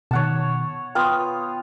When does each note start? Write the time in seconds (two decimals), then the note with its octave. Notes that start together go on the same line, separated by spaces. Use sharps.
0.11 B2 D#3 C#5 F#5 A5
0.95 B3 F4 F5 G5 C6 D#6